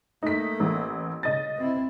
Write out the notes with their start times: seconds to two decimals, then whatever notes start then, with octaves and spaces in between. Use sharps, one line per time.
0.23 A3 A#3 D#4 B6
0.60 A1
1.23 C#3 D#5 A6
1.57 C4 E4